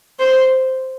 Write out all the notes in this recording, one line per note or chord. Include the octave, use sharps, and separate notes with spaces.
C5